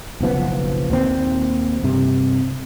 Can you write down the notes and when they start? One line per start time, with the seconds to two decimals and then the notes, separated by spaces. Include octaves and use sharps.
0.21 F#1 B1 F3 B3
0.90 D#2 A#2 C4
1.83 G2 C3